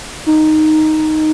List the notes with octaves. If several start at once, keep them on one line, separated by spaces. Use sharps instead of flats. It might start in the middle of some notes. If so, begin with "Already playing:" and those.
D#4